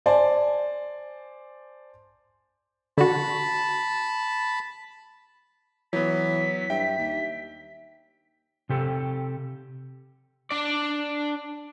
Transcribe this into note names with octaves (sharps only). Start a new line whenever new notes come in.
C5 D5 G#5 A5
D3 F#4 A5 B5
E3 F#3 B3 C#5 B6
G2 E5 G5
D#2
C3 G4 A4
D4 D5